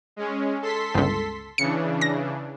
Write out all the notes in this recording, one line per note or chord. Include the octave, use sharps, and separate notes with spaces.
G#3 C#4
A4 C6 B6
G1 C#2
C#3 E3 D4 C#7
A#6